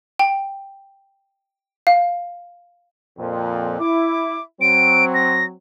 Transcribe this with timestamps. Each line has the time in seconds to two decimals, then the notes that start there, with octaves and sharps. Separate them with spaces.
0.19 G5
1.87 F5
3.18 F2 A#2
3.80 E4 D6
4.61 F#3 C4 D7
5.14 A#6